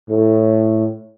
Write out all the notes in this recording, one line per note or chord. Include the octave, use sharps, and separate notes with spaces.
A2